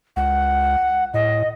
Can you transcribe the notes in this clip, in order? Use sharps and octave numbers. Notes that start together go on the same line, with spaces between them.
C#2 F#5
A2 D#5